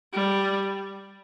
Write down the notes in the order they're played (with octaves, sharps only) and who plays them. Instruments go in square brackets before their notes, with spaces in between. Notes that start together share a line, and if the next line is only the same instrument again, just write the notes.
[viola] G3